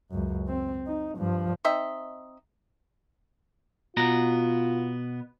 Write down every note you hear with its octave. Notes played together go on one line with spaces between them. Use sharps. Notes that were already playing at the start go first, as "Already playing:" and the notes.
C#2 F#2
C4
D#4
G2 F3
C4 D#4 D#5 E5
B2 B3 F4 A#5